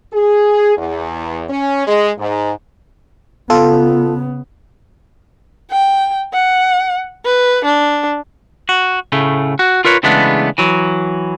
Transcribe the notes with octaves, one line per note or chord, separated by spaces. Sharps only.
G#4
E2
C#4
G#3
G#2
C#3 B3 F4 A4
G5
F#5
B4
D4
F#4
A2 C#3 A3
F#4
F4 A#4 B4 C#5
C#3 E3 G#3 A3 B3 D4
E3 F#3